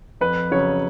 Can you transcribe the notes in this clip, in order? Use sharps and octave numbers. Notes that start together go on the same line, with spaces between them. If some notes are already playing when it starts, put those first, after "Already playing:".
F2 B4
C#3 F#3 C#5